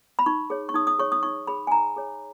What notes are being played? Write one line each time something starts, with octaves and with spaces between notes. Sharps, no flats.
B5
D#4 C#6
G#4 C#5
C#6
D#4 D#6
D#6
G#4 C#5 C#6
D#6
D#4 C#6
G#4 C#5 B5
G#5
D#4 A#5
G#4 C#5